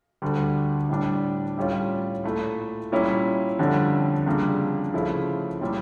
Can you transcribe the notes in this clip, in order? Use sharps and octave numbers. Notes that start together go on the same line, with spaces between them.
D2 D3 G3
A2 G3 D4
A2 G3 C#4 F4
A#2 A3 E4
A#2 G3 C#4 E4
F2 D3 G3 C#4
F2 C#3 G3 A#3 D4
C#3 F3 A3 C#4 E4
A#2 G3 C#4 E4